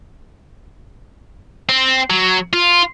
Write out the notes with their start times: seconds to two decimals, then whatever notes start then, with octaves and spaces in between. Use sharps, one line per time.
1.69 C4
2.10 F#3
2.53 F4